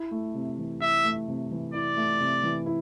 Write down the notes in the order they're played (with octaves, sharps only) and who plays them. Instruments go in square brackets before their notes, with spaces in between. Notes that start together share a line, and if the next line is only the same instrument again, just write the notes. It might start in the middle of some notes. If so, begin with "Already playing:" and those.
Already playing: [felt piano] E4
A3
C3
E3
[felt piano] E4 [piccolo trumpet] E5
[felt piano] A3
C3
E3
[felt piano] E4 [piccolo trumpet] D5
[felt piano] A3
C3
E3
E4